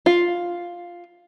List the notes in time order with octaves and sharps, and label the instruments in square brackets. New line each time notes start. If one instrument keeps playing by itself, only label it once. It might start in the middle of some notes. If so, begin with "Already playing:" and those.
[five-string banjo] F4